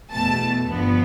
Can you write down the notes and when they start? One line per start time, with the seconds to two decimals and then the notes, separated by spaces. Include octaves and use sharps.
0.11 E2 B2 A3 A5
0.69 G1 G2 F3 B3